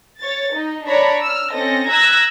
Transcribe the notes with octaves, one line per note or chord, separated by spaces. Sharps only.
C#5 A6
D#4
D4 C#5 D5 A#5 B5
E6 F6
C4 C#4 A4 D#5 A#6
A#5 E6 F#6 G#6 A#6 B6